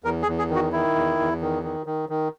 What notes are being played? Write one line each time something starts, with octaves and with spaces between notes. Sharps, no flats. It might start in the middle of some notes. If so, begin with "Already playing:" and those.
E2 A#4
G#4
E2
G#4
D#3
F#4
D#3 E4
E2
E2
D#3
D#3
D#3
D#3